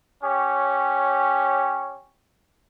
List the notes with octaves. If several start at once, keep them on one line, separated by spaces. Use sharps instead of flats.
C#4 G4 C#5